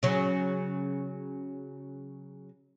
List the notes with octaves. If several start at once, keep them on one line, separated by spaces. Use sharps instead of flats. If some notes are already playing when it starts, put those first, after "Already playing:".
C#3 F#3